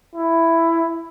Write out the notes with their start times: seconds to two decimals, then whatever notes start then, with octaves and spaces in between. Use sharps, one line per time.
0.15 E4